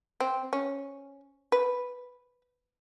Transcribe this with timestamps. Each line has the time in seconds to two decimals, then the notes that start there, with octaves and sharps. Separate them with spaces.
0.20 C4
0.53 C#4
1.52 B4